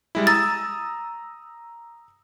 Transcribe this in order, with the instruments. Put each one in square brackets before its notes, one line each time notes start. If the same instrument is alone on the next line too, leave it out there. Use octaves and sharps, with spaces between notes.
[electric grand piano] G3 G#3 E4
[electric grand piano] A#5 D#6 E6 [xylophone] A6